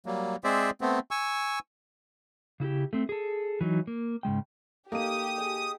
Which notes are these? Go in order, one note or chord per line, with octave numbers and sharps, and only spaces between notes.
F#3 G3 A#3
G#3 C4 G#4 C5 D5 E5
A3 B3 C4
G#5 C#6 E6
C#3 E4 F#4 G4
A3 C4
G#4 A4
E3 F#3 D#4
A#3
G#2 C#3 G#3 G5
A3 A#3 D#4 G4 F5 D#6 D#7
G#4 G5